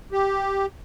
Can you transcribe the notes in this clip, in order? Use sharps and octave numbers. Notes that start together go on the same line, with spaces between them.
G4